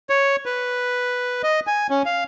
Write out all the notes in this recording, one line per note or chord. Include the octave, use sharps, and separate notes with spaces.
C#5
B4
D#5
G#5
C#4
F5